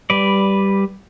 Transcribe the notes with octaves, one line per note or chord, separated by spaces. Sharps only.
G3 B4 D5